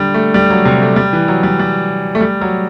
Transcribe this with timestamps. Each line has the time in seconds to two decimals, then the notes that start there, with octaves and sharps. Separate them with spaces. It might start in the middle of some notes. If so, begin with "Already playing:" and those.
Already playing: D3 G3
0.14 A3
0.34 G3
0.50 F#3
0.65 C3
0.82 A3
0.96 G3
1.13 E3
1.28 F#3
1.43 G3
1.59 G3
2.15 A3
2.21 G3
2.41 F#3